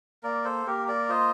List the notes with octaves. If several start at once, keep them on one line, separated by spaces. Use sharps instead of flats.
A#3 A#4 D5
A4 C5
A#3 G4 A#4
A#4 D5
F4 C5 D#5